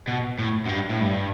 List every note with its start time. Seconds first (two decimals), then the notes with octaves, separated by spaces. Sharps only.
0.08 B2
0.39 A2
0.66 F#2
0.69 G2
0.90 A2
1.01 G2